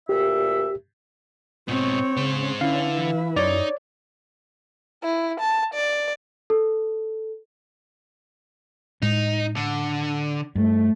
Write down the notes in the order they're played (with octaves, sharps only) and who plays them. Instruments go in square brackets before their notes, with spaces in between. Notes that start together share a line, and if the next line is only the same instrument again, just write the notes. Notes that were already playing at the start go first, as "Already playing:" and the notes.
[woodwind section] D2 A#2 E5 [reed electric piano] G4
[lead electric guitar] G#2 B2 [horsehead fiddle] C4 C#5
[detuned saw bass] C#3 [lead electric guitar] G#3 C5
[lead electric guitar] D3 [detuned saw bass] C#4 [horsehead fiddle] E4 B4 [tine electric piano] F5
[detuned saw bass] E3
[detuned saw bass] F#2 [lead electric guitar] D#4 [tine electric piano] C#5 D5
[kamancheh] E4
A5
D5
[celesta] A4
[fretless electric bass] A2 G#3 [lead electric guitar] D#4
[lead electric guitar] D3
[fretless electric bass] G2 [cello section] A3